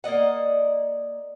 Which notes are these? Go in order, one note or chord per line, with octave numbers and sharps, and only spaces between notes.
A#3 D5 D#5 F#5